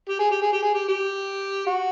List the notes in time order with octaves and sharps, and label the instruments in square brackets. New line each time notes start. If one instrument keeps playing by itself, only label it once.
[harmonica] G4
G#4
G4
G#4
G4
G#4
G4
G4
F#4